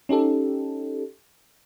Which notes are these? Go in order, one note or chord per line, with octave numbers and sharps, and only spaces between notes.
C#4 D#4 G4 A4